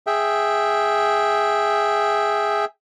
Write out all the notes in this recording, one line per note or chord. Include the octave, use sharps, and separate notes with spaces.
G#4 E5 G5